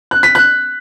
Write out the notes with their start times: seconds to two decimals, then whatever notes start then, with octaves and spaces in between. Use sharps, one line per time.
0.11 F#6
0.23 B6
0.35 F#6